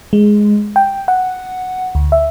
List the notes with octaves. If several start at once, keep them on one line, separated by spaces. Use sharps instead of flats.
G#3
G5
F#5
D2
E5